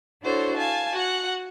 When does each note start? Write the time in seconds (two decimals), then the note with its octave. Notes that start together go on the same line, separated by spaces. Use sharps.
0.22 D4 E4 F#4 A4 C5 C#5
0.56 F5 G#5 A5
0.95 F#4 F#5